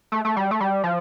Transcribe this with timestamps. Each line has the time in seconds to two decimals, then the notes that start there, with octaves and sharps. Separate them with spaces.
0.12 A3
0.25 A3
0.37 G3
0.51 A3
0.61 G3
0.84 F3